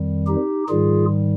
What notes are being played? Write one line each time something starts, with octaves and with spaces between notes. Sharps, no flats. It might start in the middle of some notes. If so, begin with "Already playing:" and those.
Already playing: F2 D#3 G3
D#4 G4
G#2 D#3 G3 F4 G#4